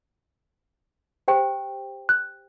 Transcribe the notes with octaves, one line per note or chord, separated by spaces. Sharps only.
G4 C5 G5
F#6